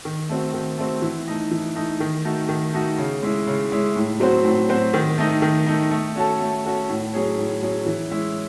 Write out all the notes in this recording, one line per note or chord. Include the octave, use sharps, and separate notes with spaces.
D#3
A3 C4 F#4
D#3
A3 C4 F#4
E3
A3 D#4
E3
A3 D#4
D#3
A3 D#4 F#4
D#3
A3 D#4 F#4
C#3
G#3 C#4 E4
C#3
G#3 C#4 E4
A2
F#3 C4 F#4 C5
A2
F#3 C4 F#4 C5
D#3
A3 D#4
D#3
A3 D#4
A3
C#4 F#4 A4
A3
C#4 F#4 A4
A2
F#3 C#4 G#4 C#5
A2
F#3 C#4 G#4 C#5
E3
G#3 C#4 E4